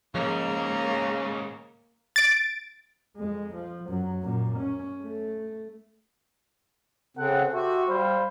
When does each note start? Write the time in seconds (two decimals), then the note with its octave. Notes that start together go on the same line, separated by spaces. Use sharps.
0.15 D#2 G#2 C#3 F3 A#3
2.16 A6 D7
3.17 F2 G#3
3.55 F3
3.89 F#2 F#3
4.23 F#2 A#2
4.59 C#4
5.04 A3
7.17 C#3 C4 A4 F#5
7.53 F#4 G4 C5 E5
7.88 G3 C5 F5 B5